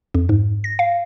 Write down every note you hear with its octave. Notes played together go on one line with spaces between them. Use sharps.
F2
G#2
A#6
F5